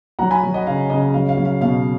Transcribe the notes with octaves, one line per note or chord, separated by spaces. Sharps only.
F#3 F#5 A#5
G#5 B5
F#3
D#5 F#5
C#3 F5
C#3 D#5
F#3 F5
F5
F#3
F5
B2 F5